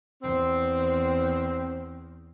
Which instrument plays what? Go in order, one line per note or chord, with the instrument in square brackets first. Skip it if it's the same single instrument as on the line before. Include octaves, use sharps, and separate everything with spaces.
[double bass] E2 [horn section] C4